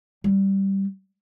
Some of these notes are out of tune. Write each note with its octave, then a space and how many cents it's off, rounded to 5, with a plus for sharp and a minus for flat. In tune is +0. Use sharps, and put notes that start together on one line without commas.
G3 -5